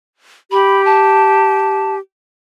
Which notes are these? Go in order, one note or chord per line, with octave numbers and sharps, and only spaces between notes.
G4 B5
A5